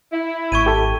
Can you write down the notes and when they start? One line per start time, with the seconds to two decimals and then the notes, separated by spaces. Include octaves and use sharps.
0.12 E4
0.52 G#1 C#6 G#6 D#7
0.66 G4 A4